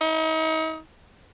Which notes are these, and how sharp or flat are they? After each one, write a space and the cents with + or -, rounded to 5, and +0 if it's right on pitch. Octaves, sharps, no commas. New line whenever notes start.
D#4 +40